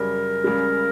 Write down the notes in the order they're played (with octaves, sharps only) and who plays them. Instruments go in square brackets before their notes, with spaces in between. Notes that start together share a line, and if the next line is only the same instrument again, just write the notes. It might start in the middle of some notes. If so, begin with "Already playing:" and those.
Already playing: [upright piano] F#2 C#3 G3 [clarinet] A#4
[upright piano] C#2 C#3 G3